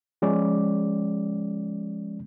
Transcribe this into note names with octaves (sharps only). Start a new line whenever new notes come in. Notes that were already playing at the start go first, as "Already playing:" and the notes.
F3 G#3 C#4 D5